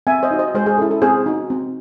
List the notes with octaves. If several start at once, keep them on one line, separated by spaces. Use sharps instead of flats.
C4 E5 G#5
C5 D#5
D#4 F#4
C5 D#5
G#3 G#4 C5
G#4
C#4 E4 A4
A4
C4 G#4 C5
D#4 F#4
C4